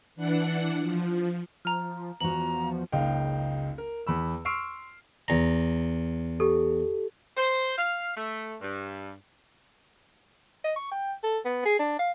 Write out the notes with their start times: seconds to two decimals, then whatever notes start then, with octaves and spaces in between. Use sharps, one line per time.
0.16 E3 D4 F#5
0.80 F3
1.65 F3 A#5 F6
2.21 E2 F3 F#4 A#5 F#7
2.92 F#1 C#2 D#4 F5 G5
3.78 A#4
4.07 E2 B5 E6
4.45 C6 C#6 E6 F6 C7 D7
5.28 E2 A#5
6.40 G4 A4
7.37 C5
7.78 F5
8.16 A3
8.61 G2
10.64 D#5
10.76 C#6
10.92 G5
11.23 A4
11.45 B3
11.66 G#4
11.79 D4
11.99 F5